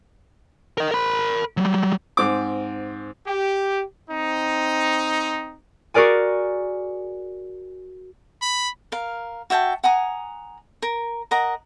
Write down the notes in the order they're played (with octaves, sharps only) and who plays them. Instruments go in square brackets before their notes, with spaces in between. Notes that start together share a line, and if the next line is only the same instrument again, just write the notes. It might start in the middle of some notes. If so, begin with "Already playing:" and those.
[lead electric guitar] A#4 D#5
A#4 B5
F#3 G3
[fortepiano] G#2 C4 D6
[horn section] G4
C4 D#4
[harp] F#4 G#4 A#4 D5 G#5
[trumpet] B5
[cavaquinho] A#4 F5
F#4 E5 G5 A5
F#5 G#5 A#5 D#6
A#4
A#4 D#5 F#5 A#5